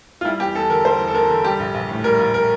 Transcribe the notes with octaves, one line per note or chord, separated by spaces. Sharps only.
F4
G3 E4
E2 G4
E2 A4
D3 A#4
G3 C5
E2
A4
E2 A#4
D3
G3 G4
A#1
A#1
A2
G3 A#4
A#1
A#4